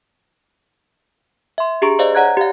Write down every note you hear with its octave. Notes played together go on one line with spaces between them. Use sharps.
E5 C6
D4 G4 G#4 A#5 C#6 D7
C5 D5 D#5 F5
C#5 D5 F#5 A#5 F#6 G#6
G4 F5